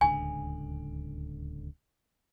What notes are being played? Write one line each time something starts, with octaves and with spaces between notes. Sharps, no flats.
D1 C#2 D3 G#5